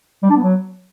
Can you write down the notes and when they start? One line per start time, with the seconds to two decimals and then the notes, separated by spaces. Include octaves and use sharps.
0.23 G3
0.30 D4
0.36 B3
0.43 F#3